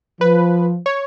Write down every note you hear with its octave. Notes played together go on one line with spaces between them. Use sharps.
F3 B4
C#5